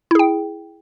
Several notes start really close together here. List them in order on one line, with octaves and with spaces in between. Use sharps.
E4 G#4 G5